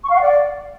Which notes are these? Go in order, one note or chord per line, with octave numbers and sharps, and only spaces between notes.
C#6
F5
F#5
D5